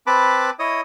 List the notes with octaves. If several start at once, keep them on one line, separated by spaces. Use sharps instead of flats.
C4 B4 A5 B5 D6
E4 C#5 D#5 D#6